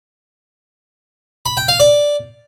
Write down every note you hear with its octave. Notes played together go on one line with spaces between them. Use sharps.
B5
G5
F5
D5